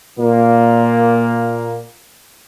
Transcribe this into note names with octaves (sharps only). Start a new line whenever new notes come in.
A#2 A#3